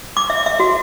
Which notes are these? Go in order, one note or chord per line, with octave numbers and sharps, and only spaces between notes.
D6
E5
E5
F#4